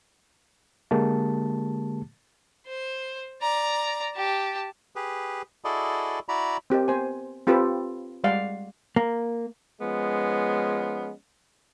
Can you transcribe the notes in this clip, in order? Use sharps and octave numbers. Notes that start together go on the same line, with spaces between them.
D3 G#3 A#3 G4 A5
C5
D5 A#5
G4 A5
G4 G#4 B4
E4 F#4 G#4 A4 D5 D#5
E4 F#4 D5 A#5 B5
C4 G4 A#4 D#5
B3 C5 G#5
C4 F4 G4 A4 B4
G3 G#3 D5 F5 F#5
A#3
F3 G#3 B3 C#4